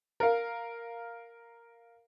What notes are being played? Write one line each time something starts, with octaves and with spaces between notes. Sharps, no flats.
A#4 F5